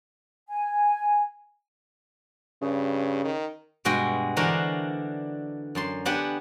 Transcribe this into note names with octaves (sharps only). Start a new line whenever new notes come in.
G#5
G2 C#3
D#3
G2 B2 G#3 F#4 G5
D3 E3 D4 F#4 A#4 C5
F#2 A5 C6
B3 D4 G4 F#5 G#5